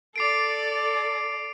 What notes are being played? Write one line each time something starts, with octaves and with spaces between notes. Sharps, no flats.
A4 D5 D6 C7 D7